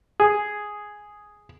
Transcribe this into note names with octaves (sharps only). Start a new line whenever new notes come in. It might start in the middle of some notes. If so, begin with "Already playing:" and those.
G#4